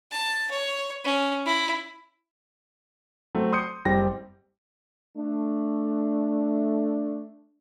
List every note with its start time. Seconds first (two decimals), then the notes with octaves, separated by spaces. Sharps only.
0.11 A5
0.50 C#5
1.04 C#4
1.46 E4
3.35 F#3 A3 C4
3.52 C6 D#6 G6 C#7
3.85 F#1 G3 C4 G5 A#6
5.17 A3 D4